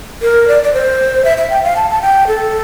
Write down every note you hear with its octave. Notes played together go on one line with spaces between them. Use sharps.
A#4
D5
D5
C5
E5
E5
G5
F5
A5
A5
G5
A4